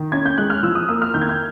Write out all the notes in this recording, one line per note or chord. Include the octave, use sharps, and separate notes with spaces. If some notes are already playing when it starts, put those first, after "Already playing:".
Already playing: D#3
C#4 G#6
G6
G#3 F#6
F6
F3 E6
D#6
A#3 E6
F6
D#3 G6
G#6
G6